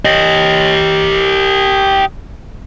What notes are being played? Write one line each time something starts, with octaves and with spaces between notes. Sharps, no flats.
G4 D#5